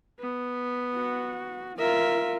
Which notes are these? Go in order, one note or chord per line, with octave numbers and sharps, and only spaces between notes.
B3
F#4
F4 A#4 E5